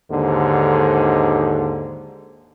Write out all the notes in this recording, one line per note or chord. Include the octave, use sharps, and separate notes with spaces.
D#2 G#2 D3